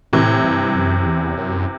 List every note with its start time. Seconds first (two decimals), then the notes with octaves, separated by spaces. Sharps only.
0.13 A2 C3 E3
0.44 G2
0.75 F#2
1.06 E2
1.37 F#2